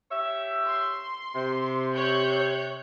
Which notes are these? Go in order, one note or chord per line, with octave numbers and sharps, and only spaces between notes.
G4 C#5 E5
C6
C3
C#5 F#6 G6